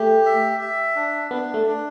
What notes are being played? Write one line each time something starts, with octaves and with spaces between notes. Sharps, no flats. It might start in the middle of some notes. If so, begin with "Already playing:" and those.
Already playing: A3 G4
E5
E5
D4
B3 D4
A3
D4